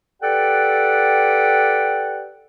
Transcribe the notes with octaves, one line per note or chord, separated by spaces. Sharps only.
G4 A4 B4 D5 F#5 G5